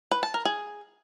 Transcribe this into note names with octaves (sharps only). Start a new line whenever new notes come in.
B4
A5
A#4
G#4